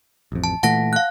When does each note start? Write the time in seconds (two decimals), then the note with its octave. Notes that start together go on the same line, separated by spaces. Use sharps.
0.32 A1 F2
0.44 A5
0.63 A#2 E3 A3 F#5 A5 A#6
0.93 F5 F#6